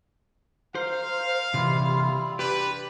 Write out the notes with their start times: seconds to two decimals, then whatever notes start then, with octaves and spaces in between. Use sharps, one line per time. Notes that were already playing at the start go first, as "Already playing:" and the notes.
0.75 A#4 C5 F5
1.54 C3 E3 G3 E4 F4
2.39 D4 G4 B4 D5